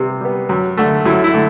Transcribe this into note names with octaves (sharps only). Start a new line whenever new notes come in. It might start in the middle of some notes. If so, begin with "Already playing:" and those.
Already playing: C3 G3 B3
G3 B3
F#2
D3 A3
F#2 E4
E4
D3 A3